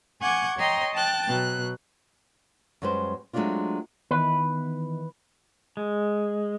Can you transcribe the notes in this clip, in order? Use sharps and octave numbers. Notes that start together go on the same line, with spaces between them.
F#5 G#5 C#6 D6 G6 G#6
C#5 D#5 G5 A#5 C6
G5 A5 F#6 A6
B2 F#3 F#6
F#2 G3 G#3 B4 C5
F#3 G#3 A3 C4 D4 F4
D#3 E3 B3 B4
G#3